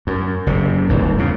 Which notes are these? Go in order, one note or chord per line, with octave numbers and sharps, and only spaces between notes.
F#2
F#1 C3
D1 G1 G#2
E2 C#3